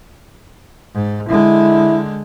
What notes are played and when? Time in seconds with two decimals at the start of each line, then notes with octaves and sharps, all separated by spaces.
0.95 G#2
1.29 D3 G#3 E4